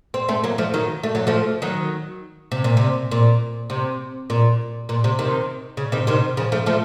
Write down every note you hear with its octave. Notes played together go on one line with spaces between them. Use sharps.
C4
A3 C4
F#3 A#3
F3 A3
D#3 F#3
A3
F#3
F3 A3
D#3 F#3
C3
A#2
C3
A#2
C3
A#2
A#2
C3
C3 D#3
C#3
C3 D#3
C3 D#3
C#3 F3
F3 A3
F3 A3